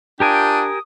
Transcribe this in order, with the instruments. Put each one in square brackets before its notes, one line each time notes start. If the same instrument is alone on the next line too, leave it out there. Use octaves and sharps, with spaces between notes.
[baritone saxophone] D4 [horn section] F4 G5 [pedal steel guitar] G4 A#4 G#5 [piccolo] D#6